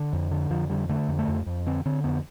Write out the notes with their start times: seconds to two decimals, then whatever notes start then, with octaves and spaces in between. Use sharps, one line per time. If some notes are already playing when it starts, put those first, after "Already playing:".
Already playing: D3
0.13 F2
0.31 D3
0.50 F2 F3
0.70 D3 G3
0.89 D3 A3
1.08 F2
1.19 A3
1.28 F2
1.46 F2
1.66 D3 C4
1.86 D3 C4
2.04 F2 B3